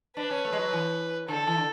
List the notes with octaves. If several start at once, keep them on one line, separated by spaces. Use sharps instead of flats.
D4 B4
C#4
A3
G#3
F#3
E3
D3 A4
E3
D3